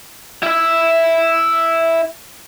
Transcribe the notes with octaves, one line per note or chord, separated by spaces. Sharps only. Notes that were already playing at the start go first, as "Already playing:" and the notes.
E4 E5